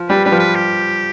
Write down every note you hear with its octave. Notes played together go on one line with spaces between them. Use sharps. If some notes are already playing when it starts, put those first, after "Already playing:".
Already playing: F3
G3 B4
G3 B4
F3
B4
G4